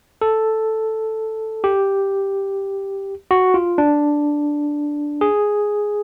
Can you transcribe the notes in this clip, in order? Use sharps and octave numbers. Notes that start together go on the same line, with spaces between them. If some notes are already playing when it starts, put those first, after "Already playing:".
A4
G4
F#4
F4
D4
G#4